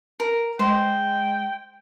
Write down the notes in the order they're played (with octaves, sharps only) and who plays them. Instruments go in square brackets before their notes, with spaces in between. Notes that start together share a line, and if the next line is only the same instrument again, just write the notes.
[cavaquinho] A#4
[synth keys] G#3 D#5 [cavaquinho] C5 [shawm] G5